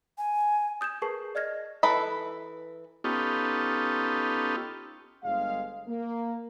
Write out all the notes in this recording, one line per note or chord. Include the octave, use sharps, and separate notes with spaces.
G#5
D#6 G6 G#6 E7
G#4 A#4 B4 A5 C#6 C7
D5 D#5 F6 G#6 A#6
E3 A4 B4 E5 B5
B3 C#4 D#4 F4 G4 A4
G1 G#3 F5
A#3